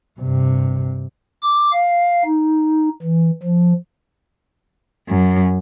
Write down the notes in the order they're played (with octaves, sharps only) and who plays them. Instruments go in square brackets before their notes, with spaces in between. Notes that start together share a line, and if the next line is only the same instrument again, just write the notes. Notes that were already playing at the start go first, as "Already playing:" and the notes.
[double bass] G2 C3
[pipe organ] D6
F5
D#4
E3
F3
[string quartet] F#2